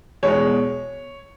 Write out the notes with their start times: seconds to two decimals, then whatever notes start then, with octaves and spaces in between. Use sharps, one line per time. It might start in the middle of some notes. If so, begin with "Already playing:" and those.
0.23 E2 B2 G#3 C#5